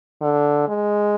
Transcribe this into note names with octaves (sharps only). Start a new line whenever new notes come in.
D3
G#3